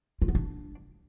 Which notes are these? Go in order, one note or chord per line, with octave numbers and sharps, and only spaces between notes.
F4
B3
D4